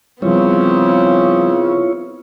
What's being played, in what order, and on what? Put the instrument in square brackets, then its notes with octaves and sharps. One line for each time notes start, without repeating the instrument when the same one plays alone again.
[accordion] C#3 [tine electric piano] F3 G3 [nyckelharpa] B3 C4 [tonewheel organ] E4 F4 C#5